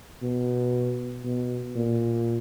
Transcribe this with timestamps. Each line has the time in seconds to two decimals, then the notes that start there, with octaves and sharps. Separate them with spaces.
0.22 B2
1.24 B2
1.75 A#2